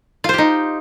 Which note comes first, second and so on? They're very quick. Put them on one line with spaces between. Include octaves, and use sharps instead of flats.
F4 C5 G4 D#4